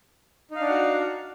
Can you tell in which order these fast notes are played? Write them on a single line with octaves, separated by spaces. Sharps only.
D#4 F5 D4 F#5 F#4